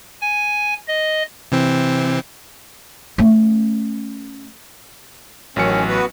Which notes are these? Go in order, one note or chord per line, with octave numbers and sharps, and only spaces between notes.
G#5
D#5
C3 E3 C4
A3 C#4
A1 D#3 F#3 C#4 C#7
B3 F#4 B4